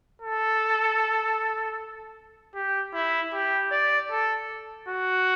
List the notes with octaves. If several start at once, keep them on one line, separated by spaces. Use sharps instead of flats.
A4
G4
E4
G4
D5
A4
F#4